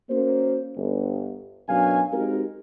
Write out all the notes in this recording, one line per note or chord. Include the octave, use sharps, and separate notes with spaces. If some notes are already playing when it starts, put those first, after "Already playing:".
A#3 C#4 F#4 C5
G1
F#2 B2 F#3 D4 F5 G#5
G#3 C4 D#4 F#4 G4 A#4